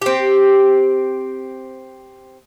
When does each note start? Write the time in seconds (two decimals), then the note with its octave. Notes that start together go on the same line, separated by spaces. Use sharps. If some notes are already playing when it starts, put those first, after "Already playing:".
0.02 C4 G4